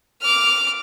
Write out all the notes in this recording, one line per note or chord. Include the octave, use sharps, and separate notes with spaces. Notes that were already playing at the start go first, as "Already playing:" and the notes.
D6 F6